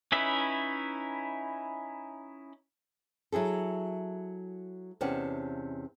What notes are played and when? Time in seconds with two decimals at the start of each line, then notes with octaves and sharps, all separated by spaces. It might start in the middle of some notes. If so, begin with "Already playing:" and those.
0.12 C#4 D#4 E4 B4 E5
3.32 F#3 E4 G#4 A4
5.01 E2 C3 C#4 D4 F#5